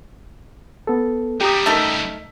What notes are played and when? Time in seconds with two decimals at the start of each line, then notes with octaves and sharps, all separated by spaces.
0.87 B3 A4
1.41 C#3 G3 G4 G5 A#5 D#6
1.66 A3 D#4 A#4 E6 B6